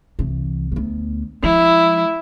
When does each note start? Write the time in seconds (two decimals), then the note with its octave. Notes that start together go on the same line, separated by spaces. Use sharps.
0.19 C2 E3
0.72 D2 B3
1.43 F3 G#3 E4